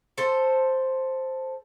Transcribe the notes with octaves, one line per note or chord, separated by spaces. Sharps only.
A4 C5